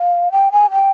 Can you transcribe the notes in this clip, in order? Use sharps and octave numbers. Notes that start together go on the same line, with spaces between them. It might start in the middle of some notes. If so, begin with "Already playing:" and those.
Already playing: F5
G5
G#5
G5